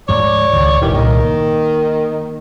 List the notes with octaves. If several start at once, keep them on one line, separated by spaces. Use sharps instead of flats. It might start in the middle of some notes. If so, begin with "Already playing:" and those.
D2 G#2 F3 C#5 D5
C#2 D#3
D#1 D#3 E3 G3
C2 A#2 D#3
A#3